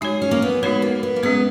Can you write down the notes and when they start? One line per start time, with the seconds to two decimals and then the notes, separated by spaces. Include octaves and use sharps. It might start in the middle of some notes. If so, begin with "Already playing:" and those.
0.01 G#3 D#4 F#4 G#4 C#5
0.22 C#4
0.31 A#3
0.42 B3
0.63 G#3 B3 D#4 F#4 C#5
0.82 A#3
1.03 B3
1.16 A#3
1.23 G#3 B3 C#4 G#4 B4